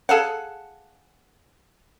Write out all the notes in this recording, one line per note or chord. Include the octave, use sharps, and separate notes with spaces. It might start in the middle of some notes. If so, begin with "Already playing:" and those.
G#4 A4 F5 F#5